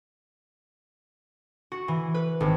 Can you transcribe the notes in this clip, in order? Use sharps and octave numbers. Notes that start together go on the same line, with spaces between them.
F#4
E3
B4
G#1